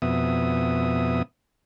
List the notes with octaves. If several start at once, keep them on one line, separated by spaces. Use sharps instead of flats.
F2 B2 B3 E5 D#6